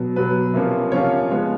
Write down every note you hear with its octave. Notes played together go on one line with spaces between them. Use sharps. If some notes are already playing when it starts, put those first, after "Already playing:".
Already playing: B2 F#3 B3
B2 F#3 B3 B4
C3 F3 A#3 C#4 F4
C3 F3 A#3 C#4 F4 C#5
F3 G#3 B3